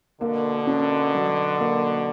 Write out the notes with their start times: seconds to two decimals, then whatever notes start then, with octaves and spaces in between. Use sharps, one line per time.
0.21 B2 D3 A#3
0.67 C#4
1.14 F#3
1.60 A#3